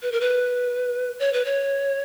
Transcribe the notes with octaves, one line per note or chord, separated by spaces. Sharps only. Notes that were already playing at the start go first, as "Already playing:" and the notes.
B4
A#4
B4
C#5
B4
C#5